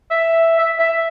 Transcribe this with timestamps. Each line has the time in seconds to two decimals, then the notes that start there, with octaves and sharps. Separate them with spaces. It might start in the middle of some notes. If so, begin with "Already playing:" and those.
0.11 E5
0.59 E5
0.79 E5